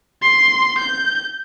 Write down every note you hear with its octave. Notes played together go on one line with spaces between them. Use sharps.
C6
G6